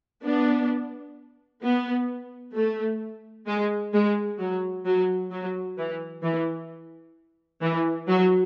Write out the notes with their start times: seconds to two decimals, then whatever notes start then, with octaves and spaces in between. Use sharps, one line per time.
0.24 B3 D4
1.63 B3
2.55 A3
3.47 G#3
3.93 G#3
4.39 F#3
4.86 F#3
5.32 F#3
5.77 E3
6.23 E3
7.62 E3
8.08 F#3